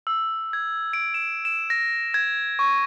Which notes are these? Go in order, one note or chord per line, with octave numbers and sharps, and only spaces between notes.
E6
G#6
D7
E7
E7
A#6
G#6
C#6